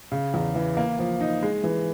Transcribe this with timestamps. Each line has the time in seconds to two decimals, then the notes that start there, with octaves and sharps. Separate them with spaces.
0.12 C#3
0.34 E2
0.55 E3
0.77 A#3
0.99 F3
1.21 D#4
1.43 G#3
1.64 E3